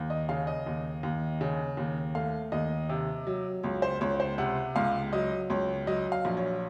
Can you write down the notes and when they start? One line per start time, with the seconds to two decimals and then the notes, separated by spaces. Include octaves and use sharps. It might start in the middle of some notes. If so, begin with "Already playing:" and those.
Already playing: D#2
0.10 D#5
0.29 C#3 F5
0.47 D#5
0.66 D#2
1.03 D#2
1.41 C#3
1.77 D#2
2.15 A3 F5
2.52 D#2 D#5
2.89 C3
3.27 F#3
3.63 C#2 C#5
3.82 C5
4.01 C#2 C#5
4.20 C5
4.38 C3 F#5
4.76 C#2 F5
5.13 F#3 D#5
5.50 C#2 C#5
5.87 F#3 D#5
6.12 F5
6.25 A#1
6.37 C#5